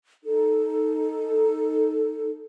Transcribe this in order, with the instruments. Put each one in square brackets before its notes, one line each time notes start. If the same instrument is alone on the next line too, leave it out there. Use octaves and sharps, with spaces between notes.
[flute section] D#4 A4